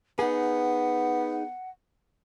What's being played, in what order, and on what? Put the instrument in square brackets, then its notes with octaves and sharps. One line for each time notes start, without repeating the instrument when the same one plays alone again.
[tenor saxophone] B3 [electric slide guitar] D#4 G#4 [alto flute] F#5